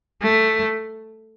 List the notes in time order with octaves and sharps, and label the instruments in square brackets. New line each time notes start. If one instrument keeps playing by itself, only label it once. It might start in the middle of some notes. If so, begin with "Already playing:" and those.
[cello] A3